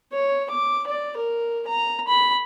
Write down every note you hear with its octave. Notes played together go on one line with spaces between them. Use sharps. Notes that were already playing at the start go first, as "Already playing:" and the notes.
C#5
D6
D5
A#4
A#5
B5